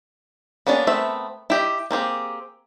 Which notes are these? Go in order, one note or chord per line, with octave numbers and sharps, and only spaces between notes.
A#3 B3 C#4 D4 G#4
A3 B3 C4 A#4 E5
E4 G4 D#5
A#3 C4 G4 G#4